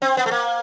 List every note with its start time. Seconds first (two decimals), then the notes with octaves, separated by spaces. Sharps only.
0.02 C4
0.17 B3
0.26 A3
0.31 A#3